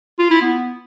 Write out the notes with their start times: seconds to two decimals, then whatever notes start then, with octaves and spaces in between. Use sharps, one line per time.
0.19 F4
0.31 E4
0.42 B3